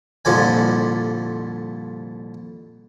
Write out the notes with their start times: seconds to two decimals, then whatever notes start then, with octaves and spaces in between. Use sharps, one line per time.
0.25 C2 F2 A#2 D3 D5 G#5